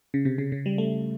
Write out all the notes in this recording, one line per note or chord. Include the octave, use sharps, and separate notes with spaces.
C#3
C3
C#3
C#3
G3
A3